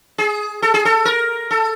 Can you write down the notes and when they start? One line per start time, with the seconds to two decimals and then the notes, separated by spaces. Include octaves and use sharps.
0.18 G#4
0.62 A4
0.74 G#4
0.85 A4
1.05 A#4
1.51 A4